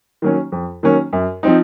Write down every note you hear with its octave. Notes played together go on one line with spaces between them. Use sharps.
D#3 F#3 A#3 C#4
F2
D#3 F#3 A#3 C#4
F#2
F3 C4 D#4